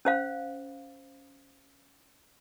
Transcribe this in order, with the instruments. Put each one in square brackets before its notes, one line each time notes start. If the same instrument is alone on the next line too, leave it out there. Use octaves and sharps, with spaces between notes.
[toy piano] C#4 C5 F5